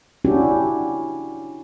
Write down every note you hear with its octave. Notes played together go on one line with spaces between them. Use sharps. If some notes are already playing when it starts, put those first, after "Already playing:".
C#4 D4 E4 F#4 G4